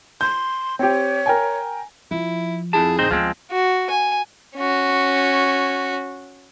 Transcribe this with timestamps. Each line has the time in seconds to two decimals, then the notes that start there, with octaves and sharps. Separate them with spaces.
0.21 C6 G6
0.79 C4 G4 C#5
1.26 A#4 G5 G#5
2.11 F3 E4
2.73 F2 E4 G#4 A5
2.99 A1 E2 C4 D#4 C5
3.11 D2 F3 G#3 B3 C4
3.51 F#4
3.90 G#5
4.56 C#4 F#4